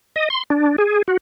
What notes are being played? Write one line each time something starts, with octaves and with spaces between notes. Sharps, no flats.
D#5
C6
D4
G#4
F#4